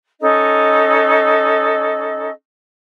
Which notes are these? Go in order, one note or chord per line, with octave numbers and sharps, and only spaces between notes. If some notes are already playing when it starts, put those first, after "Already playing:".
C#4 D#4 A4 D#5